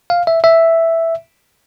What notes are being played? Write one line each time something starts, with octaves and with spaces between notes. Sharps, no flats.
F5
E5
E5